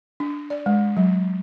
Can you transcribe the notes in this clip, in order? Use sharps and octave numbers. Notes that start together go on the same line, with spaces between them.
D4
D5
G#3
F#3